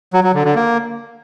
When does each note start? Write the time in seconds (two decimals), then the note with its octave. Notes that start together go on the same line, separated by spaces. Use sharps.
0.13 F#3
0.24 F#3
0.34 D3
0.45 D3
0.55 A#3